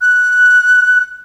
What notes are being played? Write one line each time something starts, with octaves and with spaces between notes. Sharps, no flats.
F#6